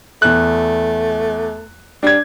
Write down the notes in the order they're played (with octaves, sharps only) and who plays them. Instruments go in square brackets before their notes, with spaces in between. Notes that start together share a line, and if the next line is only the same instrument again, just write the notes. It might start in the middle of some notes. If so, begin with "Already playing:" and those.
[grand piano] E2 F#6 [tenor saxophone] A3
[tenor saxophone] G3 [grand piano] D4 G#6